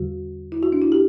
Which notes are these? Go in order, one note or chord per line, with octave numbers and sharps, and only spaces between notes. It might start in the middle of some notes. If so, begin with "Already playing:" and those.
Already playing: E2 D3 G3 F#4
E4
F#4
D4
E4
G4